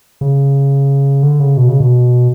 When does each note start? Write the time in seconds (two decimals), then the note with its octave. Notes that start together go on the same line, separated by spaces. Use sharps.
0.21 C#3
1.23 D3
1.40 C#3
1.57 B2
1.69 C#3
1.80 B2